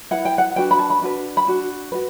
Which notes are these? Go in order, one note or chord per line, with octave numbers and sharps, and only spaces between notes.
E4 B4 F#5
G5
F#5
D4 F#4 B4 G5
B5
A5
B5
D4 F#4 B4
B5
D4 F#4
F#4 B4